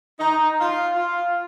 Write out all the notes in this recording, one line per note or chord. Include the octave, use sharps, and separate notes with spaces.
D#4
F4
F4